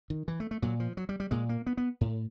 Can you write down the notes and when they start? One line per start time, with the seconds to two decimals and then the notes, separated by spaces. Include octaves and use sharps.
0.10 D#3
0.28 E3
0.40 A3
0.51 A3
0.62 A#2 F#3
0.80 F3
0.97 F#3
1.09 G3
1.20 G3
1.31 A#2 G#3
1.49 A#3
1.66 B3
1.77 B3
2.01 A2